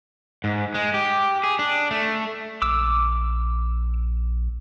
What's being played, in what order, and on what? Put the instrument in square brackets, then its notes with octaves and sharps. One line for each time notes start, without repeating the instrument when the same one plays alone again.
[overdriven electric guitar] G#2
G#3
G4
G#4
D4
A3
[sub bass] A#1 [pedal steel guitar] D6 E6